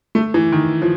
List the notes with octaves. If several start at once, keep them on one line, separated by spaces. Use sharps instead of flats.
A3
E3
D#3
F3